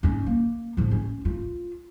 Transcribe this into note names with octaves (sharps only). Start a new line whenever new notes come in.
C#4 D#4
A#3
A2 F3
C#4
F4